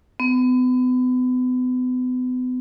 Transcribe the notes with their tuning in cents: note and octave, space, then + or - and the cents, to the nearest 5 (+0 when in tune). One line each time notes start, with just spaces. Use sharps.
B3 +35